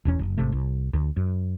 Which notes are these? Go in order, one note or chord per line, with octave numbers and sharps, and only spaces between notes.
E1 E2 C#4
F#1
G#1 C3 A3
C2
D2
F#2